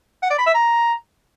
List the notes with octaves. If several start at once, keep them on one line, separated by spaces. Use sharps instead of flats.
F#5
D5
B5
E5
A#5